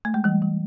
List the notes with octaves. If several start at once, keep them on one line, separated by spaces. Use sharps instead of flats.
A3
G#3
E3 G3
E3